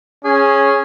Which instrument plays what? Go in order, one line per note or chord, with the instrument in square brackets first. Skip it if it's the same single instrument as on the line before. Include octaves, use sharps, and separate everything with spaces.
[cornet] C#4 [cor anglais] G#4